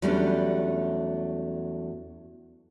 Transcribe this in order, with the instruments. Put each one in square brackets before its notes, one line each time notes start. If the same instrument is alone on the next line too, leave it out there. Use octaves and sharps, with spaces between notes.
[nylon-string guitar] E2 F#3 G3 A3 C#4 D4